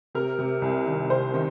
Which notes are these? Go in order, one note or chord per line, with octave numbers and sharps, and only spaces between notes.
C3 A#4
C3
C2
D#3
C3 C5
D#3